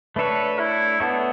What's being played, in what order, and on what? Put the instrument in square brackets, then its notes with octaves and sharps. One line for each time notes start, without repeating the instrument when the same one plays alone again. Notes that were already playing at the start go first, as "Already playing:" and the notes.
[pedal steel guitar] A3 D4 A4 C#5 [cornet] B4
[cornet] E4
[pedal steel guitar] A3 D4 A4 C#5 [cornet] B3